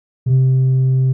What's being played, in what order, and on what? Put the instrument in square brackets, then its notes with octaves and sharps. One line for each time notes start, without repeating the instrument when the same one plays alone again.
[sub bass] C3